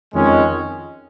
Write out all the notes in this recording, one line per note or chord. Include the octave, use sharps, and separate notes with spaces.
F2 D#3 G#3 C#4